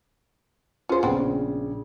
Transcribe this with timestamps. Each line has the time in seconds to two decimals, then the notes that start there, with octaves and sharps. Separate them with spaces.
0.89 C#4 F4 G#4 C5
1.03 A#1 C#3 B3 C4